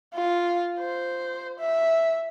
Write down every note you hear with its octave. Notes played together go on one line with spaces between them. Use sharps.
F4
C5
E5